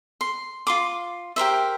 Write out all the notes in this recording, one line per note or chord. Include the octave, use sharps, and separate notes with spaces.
C6
F4 C6 D6
G4 A#4 C5 E5